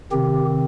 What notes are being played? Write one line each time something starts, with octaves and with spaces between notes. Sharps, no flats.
C3 D#3 C4 G4